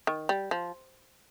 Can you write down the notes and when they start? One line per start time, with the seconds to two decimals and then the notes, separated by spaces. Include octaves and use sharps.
0.07 D#3
0.29 G3
0.51 F3